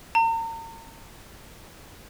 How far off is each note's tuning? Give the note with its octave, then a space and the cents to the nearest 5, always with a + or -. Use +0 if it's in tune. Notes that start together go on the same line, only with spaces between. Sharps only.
A#5 -40